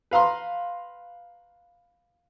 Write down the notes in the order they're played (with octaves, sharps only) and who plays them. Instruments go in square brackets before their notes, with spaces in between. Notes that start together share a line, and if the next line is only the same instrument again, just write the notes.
[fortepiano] B4 F5 A#5 C6